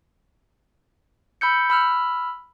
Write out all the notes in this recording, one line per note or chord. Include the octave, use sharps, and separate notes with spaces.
B5 E6 G6 C#7
B5 E6 F6